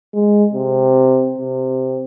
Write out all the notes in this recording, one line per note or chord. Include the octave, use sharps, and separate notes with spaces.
G#3
C3
C3